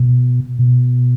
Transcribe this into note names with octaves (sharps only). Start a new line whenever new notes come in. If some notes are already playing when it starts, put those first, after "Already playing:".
Already playing: B2
B2